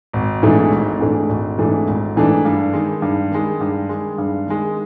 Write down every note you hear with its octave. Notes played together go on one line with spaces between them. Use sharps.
G#1
G#2 E3 A3 D4
G#1
G#2 E3 A3 D4
G#1
G#2 E3 A3 D4
G#1
G#2 E3 A3 D4
G2
D#3 G#3
G2
D#3 G#3
G2
D#3 G#3
G2
D#3 G#3